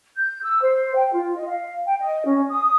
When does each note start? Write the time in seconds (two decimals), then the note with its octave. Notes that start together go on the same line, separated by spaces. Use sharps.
0.17 G6
0.43 E6
0.62 C5
0.96 G5
1.12 F4
1.36 D#5
1.47 F5
1.86 G5
2.00 D#5
2.25 C#4
2.49 D#6